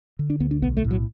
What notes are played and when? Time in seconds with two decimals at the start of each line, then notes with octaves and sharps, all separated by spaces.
0.19 D3
0.30 D4
0.40 D2 B3
0.51 D4
0.62 B1 B3
0.77 A3
0.84 A2
0.91 F#3